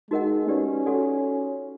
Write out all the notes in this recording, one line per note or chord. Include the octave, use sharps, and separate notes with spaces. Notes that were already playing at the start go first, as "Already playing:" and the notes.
G#3 D#4 F#4 A#4 D#5 F#5
C#4 G4 B4 D5 F#5
F#4 A4 D5 F#5